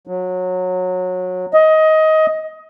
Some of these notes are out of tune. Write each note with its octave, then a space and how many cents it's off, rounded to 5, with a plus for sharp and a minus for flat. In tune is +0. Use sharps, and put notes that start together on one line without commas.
F#3 -20
D#5 +20